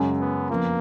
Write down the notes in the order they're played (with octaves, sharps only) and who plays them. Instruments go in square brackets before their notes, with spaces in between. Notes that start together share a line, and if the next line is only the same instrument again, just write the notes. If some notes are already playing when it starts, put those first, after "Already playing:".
Already playing: [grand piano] F#2 C#3 G#3 C#4
[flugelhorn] B3
[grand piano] F2 F3 B3 F4 [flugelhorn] A#3